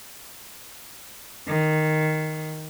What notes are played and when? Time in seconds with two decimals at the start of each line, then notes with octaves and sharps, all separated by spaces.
1.49 D#3